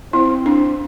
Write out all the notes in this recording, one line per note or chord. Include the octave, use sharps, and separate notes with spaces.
C4 E4
D4